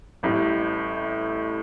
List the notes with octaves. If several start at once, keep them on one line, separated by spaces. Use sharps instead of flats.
A1 A2 G3